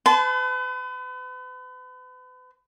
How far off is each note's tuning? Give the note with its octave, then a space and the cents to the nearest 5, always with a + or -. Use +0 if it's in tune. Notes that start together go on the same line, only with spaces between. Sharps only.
B4 +40 A5 -30 C6 -40